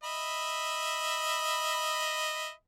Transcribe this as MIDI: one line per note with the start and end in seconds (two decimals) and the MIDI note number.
0.04 2.51 75
0.04 2.51 76
0.04 2.51 83